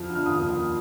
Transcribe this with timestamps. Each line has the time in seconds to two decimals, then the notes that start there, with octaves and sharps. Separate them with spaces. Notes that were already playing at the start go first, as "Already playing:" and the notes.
Already playing: F2 F3 F6
0.10 D3
0.15 F6
0.26 D#2 D#6
0.42 D#2
0.58 F3